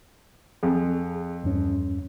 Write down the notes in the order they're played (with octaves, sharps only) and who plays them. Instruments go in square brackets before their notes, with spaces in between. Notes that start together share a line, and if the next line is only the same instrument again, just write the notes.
[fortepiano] F2 [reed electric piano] G#4
[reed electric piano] E2 G2 C#4